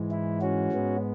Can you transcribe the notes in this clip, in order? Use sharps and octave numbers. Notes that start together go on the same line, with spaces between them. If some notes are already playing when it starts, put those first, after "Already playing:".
Already playing: G#2 E3 G#3
E4
C#4 F#4
G#2 G#3 B3